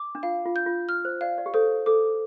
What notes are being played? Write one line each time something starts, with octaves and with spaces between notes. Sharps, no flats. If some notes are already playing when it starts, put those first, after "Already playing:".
Already playing: D6
D4
F4 F5
F4
G6
F4
F6
C5
D5 F5
D5
G4
A4 C5
A4 D6